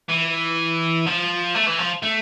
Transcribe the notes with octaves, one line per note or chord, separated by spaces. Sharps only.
E3
F3
A3
E3
F3
A3